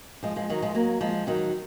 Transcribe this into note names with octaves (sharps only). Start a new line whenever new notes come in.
F3 G#3
F3 G#3
D#3 F#3
F3 G#3
F#3 A#3
F3 G#3
D#3 F#3